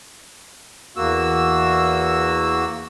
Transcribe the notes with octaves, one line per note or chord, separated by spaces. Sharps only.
E2 A#3 F#4 E6